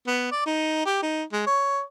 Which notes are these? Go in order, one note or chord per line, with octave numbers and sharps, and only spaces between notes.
B3
D5
D#4
G4
D#4
G#3
C#5